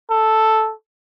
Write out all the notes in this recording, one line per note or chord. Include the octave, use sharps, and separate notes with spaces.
A4